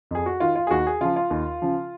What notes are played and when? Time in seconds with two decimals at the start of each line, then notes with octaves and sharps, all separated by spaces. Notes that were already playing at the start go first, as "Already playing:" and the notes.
0.11 F2 G#4
0.26 F#4
0.40 D#3 F4
0.55 F4
0.67 G#4
0.71 D#2 F#4
0.87 G#4
1.01 C#3 F3 F4
1.16 F4
1.31 D#2
1.62 C#3 F3